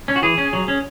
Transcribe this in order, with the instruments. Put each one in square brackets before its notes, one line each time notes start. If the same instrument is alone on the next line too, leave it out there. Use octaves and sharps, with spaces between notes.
[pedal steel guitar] C#4
F#4
E3 G#4
C#4
F#3
C#4